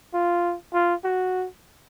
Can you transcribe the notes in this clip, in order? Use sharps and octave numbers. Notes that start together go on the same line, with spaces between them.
F4
F4
F#4